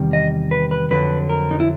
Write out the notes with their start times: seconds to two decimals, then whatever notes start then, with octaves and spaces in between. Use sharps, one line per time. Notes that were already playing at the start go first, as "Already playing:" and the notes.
Already playing: E2 C3 D#3 G3
0.13 D#5
0.51 B4
0.71 B4
0.91 F2 D3 F#3 B4
1.30 A#4
1.51 D#4
1.60 E4